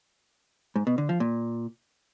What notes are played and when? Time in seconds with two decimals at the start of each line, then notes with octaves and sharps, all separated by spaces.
0.76 G#2
0.87 B2
0.98 D3
1.09 F3
1.20 A#2